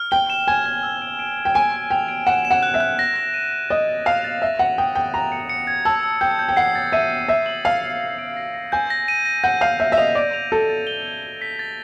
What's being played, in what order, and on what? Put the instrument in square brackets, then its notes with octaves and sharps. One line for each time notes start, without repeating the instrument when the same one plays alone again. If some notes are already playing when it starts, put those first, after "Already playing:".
Already playing: [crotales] F6
[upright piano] G5 [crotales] G7
[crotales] E7
[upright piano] G#5 [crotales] G#6
[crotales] G#6
E6
D7
D7
D7
[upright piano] G5
[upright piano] G#5 [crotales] D7
[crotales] D7
[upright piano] G5 [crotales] F7
[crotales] D7
[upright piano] F#5 [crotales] E7
[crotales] E7
[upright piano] F#5
[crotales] F#6
[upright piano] E5
[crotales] F#6
A#6
A#6
D#7
A#6
[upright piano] D#5 [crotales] A6
[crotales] A6
[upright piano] F5 [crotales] F7
[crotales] A6
[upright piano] E5 [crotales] A#6
[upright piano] F#5 [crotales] F#6
[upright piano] G5 [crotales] D#6
[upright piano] G5 [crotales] D#6
[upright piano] A#5 [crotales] F7
[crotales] C#7
C#7
G#6
[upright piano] A5 [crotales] E6
[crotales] E6
[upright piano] G5 [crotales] G6
[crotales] G6
[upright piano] G5
[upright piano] F#5 [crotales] C7
[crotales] A6
[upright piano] E5 [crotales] D#7
[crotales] D#7
[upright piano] E5 [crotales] G6
[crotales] F#7
[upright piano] F5 [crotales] D#7
[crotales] F#7
A#6
D7
A#6
A#6
[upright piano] G#5 [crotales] G6
[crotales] A#6
D#7
A#6
[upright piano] F#5 [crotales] G6
[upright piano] F5 [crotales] G6
[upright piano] E5 [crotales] G6
[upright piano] E5
[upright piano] D#5 [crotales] F7
[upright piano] D5 [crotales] D7
[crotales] F7
[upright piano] A4 [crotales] A6
[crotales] A6
G7
G#6
G7
B6
A6